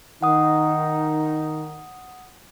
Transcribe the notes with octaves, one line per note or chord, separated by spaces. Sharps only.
D#3 D#4 F#5 D#6